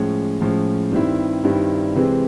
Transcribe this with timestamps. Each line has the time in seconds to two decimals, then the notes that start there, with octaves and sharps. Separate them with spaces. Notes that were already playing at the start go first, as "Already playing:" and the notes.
Already playing: A2 F3 G#3 C#4
0.41 A2 F3 G#3 C#4
0.92 G2 D#3 G3 C4 E4
1.44 G2 D#3 G3 C4 E4
1.95 C3 E3 G#3 C4